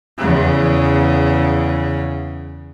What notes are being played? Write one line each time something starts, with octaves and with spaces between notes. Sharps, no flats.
E2 C#3